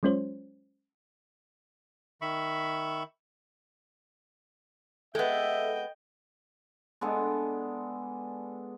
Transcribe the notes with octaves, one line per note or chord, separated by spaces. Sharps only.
F#3 G#3 C#4 F4 C5 C#5
D#3 E5 B5 C#6
G#3 B3 A4 D#5 E5 G5
G#3 B3 D4 A4